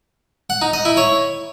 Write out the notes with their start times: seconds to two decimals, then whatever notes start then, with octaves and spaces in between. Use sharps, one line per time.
0.50 F#5
0.62 D#4
0.73 D#5
0.85 E4
0.97 C#5